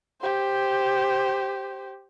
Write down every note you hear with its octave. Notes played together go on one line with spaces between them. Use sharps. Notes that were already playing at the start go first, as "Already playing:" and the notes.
G4 C5